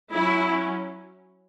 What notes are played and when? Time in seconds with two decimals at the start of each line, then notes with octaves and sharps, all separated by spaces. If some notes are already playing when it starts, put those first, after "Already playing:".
0.13 F#3 C#4 E4